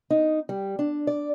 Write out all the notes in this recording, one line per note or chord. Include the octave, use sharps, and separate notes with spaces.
D#4
G3
D4
D5